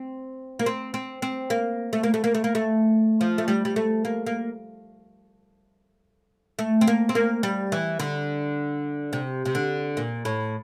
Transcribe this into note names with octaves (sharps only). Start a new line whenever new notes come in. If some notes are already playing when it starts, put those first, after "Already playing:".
Already playing: C4
A#3
C4
C4
C4
A#3
A3
A#3
A3
A#3
A3
A#3
A3
F3
A3
G3
G3
A3
A#3
A#3
A3
C4
A#3
C4
A#3
G3
E3
D3
C3
C3
D3
A#2
A2